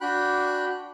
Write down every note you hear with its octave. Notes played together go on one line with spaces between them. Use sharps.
D4 F#4 G5 B5 F#6